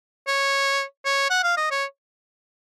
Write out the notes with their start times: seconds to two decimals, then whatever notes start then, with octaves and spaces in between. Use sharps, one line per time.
0.27 C#5
1.05 C#5
1.30 F#5
1.43 F5
1.57 D#5
1.71 C#5